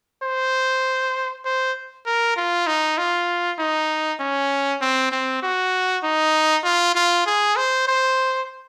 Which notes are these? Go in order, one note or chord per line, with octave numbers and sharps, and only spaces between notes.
C5
C5
A#4
F4
D#4
F4
D#4
C#4
C4
C4
F#4
D#4
F4
F4
G#4
C5
C5